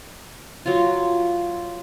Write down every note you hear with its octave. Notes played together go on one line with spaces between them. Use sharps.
F#3 F4